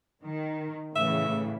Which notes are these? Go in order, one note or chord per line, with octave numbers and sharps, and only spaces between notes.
D#3
A2 C#3 E3 E5